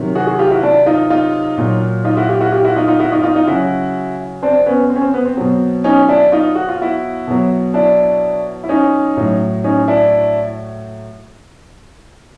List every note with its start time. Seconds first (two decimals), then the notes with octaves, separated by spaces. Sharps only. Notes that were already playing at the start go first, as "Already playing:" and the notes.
Already playing: C3 D#3 F#3
0.15 F#4 G#4
0.27 F#4 G#4
0.39 F4 G4
0.51 E4 F#4
0.63 D4 E4
0.86 D#4 F4
1.10 D#4 F4
1.58 A#2 F#3
2.04 D#4 F4
2.17 E4 F#4
2.29 F4 G4
2.40 E4 F#4
2.52 F4 G4
2.64 E4 F#4
2.76 D#4 F4
2.88 D#4 F4
3.00 E4 F#4
3.12 D#4 F4
3.23 D#4 F4
3.36 D#4 F4
3.47 C#3 F#3 E4 F#4
4.43 C4 D4
4.66 B3 C#4
4.90 C4
4.96 C#4
5.01 C4
5.14 B3
5.25 C4
5.37 B2 F#3
5.84 C#4 D#4
6.09 D4 E4
6.32 D#4 F4
6.55 F#4
6.69 F4
6.81 E4 F#4
7.27 B2 F#3
7.74 D4 E4
8.64 E4
8.69 C#4 D#4
9.17 A2 F#3
9.64 C#4 D#4
9.88 D4 E4